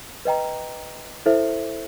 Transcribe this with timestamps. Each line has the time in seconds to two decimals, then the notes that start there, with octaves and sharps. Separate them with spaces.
0.25 B4 D#5 G5 A#5
1.26 E4 A4 C5 E5